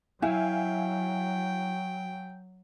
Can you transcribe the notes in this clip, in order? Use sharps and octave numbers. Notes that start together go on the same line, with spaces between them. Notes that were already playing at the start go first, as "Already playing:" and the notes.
F#3 E4 E5 F5 G5 G#5